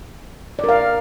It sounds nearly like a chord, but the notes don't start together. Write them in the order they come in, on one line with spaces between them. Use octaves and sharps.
D5 A#4 F5